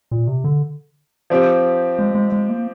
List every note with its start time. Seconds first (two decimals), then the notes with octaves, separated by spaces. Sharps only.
0.11 A#2
0.27 C3
0.44 D3
1.30 F3 C4 G4
1.99 G#3
2.15 G#3
2.32 G#3
2.49 A#3